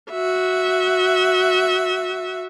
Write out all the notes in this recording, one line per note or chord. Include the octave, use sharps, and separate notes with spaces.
F#4 E5